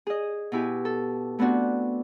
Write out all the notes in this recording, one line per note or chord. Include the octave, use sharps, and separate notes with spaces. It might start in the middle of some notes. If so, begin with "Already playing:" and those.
G#4 D#5
B2 E4 G4 G#5
A4
A3 B3 C4 D4 F#4